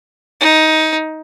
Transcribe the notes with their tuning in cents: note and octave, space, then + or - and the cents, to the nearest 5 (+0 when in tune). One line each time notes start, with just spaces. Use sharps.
D#4 +15